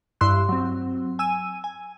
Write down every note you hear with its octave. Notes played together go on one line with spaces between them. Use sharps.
G2 E4 C6 E6 F#6
F#3 C4
G#5 E6 D#7
G#5